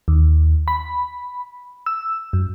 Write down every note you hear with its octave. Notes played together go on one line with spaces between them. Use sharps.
D#2
B5
E6
F#2